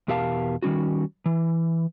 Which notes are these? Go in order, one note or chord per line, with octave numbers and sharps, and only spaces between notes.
E2 B2 G4 A#4 F5 A5
D#3 G3 C#4 F#4
E3